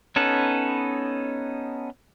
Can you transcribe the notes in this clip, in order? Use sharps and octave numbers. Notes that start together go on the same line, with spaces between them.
B3 C#4 D#4 A4 B4